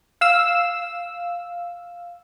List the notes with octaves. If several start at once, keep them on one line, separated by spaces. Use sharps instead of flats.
F5 E6